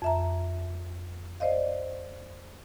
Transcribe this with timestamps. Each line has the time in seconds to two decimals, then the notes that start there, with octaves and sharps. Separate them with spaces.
0.02 F2 E5 A#5
1.40 C5 D5 D#5 F5